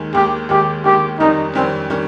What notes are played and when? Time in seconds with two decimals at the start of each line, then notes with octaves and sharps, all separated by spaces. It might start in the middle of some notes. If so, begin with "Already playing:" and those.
Already playing: D#2 D#3 G#3
0.14 D#2 D#3 G#3 G4
0.50 D#2 D#3 G#3 G4
0.85 D#2 D#3 G#3 G4
1.20 F2 D#3 G3 C#4 D#4
1.55 F2 D#3 G3 C4 C#4
1.90 D#3 G3 C#4